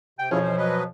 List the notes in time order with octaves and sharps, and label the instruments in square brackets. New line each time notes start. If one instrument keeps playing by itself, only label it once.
[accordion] C3 [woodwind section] G5
[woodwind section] F2 B2 F3 [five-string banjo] C#4 [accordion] E4 F4 G#4
[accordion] E3 C5
F#3 B4 D#5